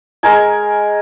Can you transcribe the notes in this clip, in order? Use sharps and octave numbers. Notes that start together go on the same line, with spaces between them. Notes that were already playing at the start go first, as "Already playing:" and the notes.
G#3 A#4 G#5